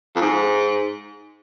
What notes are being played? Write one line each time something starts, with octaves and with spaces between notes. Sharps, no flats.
F2
G#2